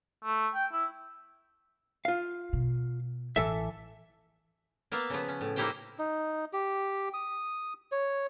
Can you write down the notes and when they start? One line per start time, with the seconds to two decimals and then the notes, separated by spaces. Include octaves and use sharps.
0.23 A3
0.54 G5
0.72 E4
2.05 F4 F5
2.53 B2
3.36 A1 E3 A4 E5
4.92 A#3 B3 E5 F5
5.10 C#3 F3 B3
5.28 C#4
5.41 A2
5.56 A#3 D#4 E4 G4 C5 G5
5.99 D#4
6.53 G4
7.14 D#6
7.92 C#5